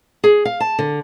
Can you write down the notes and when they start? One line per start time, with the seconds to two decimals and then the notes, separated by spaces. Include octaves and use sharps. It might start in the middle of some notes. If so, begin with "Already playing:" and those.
0.24 G#4
0.45 F5
0.60 A5
0.79 D3